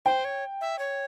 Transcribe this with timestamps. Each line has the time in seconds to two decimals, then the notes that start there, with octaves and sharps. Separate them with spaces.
0.05 C5 G5
0.25 C#5
0.61 E5
0.79 C#5